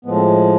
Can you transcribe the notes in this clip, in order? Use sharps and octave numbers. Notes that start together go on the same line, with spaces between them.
A2 F3 G#3 B3
C4